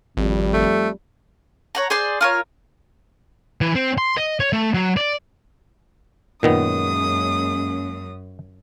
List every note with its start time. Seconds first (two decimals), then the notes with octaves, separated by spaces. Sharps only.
0.17 G#1 F2 G3
0.53 A3
1.75 C#5 F#5 A#5
1.90 G#4 C5 D5 C6
2.21 F4 A#4 C#5
3.61 E3
3.75 C4
3.98 C6
4.17 D#5
4.40 C#5
4.53 A3
4.74 F#3
4.97 D5
6.43 F#2 A#2 D#3 G#3 A#3 B3 C#4 D#6